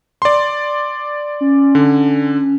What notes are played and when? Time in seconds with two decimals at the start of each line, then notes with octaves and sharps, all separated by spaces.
0.22 D5 C6
1.41 C#4
1.75 D3